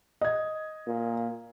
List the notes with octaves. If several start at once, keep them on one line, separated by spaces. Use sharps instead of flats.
D#5 G#6
A#2